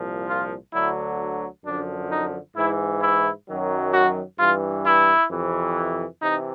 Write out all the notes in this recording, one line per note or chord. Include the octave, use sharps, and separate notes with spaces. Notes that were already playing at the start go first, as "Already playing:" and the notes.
Already playing: C2 A#2 F3
F4
D2 D3 F#3 E4
F#2 D3 F3 D4
D#4
G#2 E3 E4
E4
F#2 D#3 F#3
F#4
G2 E3 F4
E4
F2 C3 E3
C3 E3 D#4